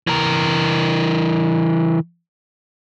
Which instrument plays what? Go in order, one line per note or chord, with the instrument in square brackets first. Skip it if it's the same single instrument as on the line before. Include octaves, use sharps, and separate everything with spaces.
[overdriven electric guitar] E3 A#4